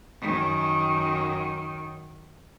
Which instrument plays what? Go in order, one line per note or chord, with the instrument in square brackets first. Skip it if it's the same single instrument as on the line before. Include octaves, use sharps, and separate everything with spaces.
[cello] F#2 D#3